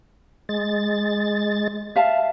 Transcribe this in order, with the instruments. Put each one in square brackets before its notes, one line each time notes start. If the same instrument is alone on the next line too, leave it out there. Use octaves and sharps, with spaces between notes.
[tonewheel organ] G#3 A6
[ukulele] E5 F5 A5